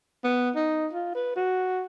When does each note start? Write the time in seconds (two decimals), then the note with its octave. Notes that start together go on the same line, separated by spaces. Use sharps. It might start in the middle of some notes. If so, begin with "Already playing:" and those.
0.24 B3
0.55 D#4
0.93 F4
1.15 B4
1.36 F#4